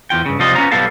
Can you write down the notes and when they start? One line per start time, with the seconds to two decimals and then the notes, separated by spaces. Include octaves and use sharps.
0.10 E2 F4 G5
0.26 G2 C#3
0.39 C3 F3 G3 F4 D#5
0.55 B3 C#4 F4 A#5
0.71 B1 G3 B3 A4 F5 A5